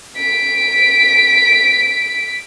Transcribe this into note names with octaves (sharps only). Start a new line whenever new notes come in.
B6 D7